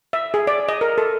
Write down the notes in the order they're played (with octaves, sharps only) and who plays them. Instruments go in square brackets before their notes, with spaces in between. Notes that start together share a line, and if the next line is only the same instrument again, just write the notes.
[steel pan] E5
G#4
D5
D#5
A#4
A4